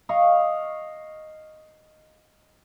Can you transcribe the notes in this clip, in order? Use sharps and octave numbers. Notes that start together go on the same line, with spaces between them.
D#5 F5 C#6